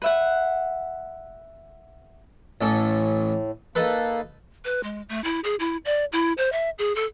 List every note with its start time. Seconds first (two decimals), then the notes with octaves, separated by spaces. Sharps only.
0.02 B4 E5 F#5
2.61 A1 A2 C#4 A4
3.75 A#3 D#4 A4 B4
4.65 B4
4.83 G#3
5.09 A3
5.24 E4
5.44 G#4
5.59 E4
5.85 D5
6.12 E4
6.38 C5
6.52 E5
6.78 G#4
6.96 A4